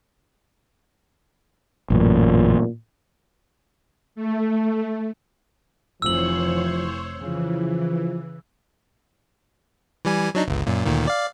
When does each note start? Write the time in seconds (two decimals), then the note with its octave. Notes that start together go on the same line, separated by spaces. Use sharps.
1.90 A1 F#2 A#2
4.16 A3
6.02 F1 E3 F3 C5 C#5 E6 F#7
7.22 C#3 E3 F3
10.05 E3 G3 G#5
10.35 F#3 D4 D#4
10.48 G1 C#2
10.66 F#2 A#2
10.86 D2 A#2 D#3
11.07 D5 F5